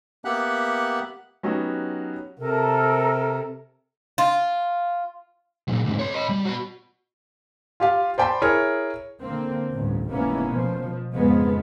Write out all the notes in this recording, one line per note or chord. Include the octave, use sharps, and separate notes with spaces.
A#3 B3 G4 E5 F#5 F#6
F#3 B3 C#4 D#4 F#4 G4
C3 A4 A#4
F4
A#2 F#3
D2 G#2
C#5 C6
D#5 B5
G3
F#4 B5
F4 G4 F5
C5 D5 G5 A5 B5 C6
E4 G#4 A#4 C#5
D3 A#3 C4
A1 D2 G2
F1 G#2 E3 A#3 B3 C#4
B2 F3
F2 G#2 C#3 F3 G#3 B3